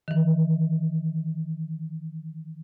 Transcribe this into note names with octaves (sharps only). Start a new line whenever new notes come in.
D#3 E3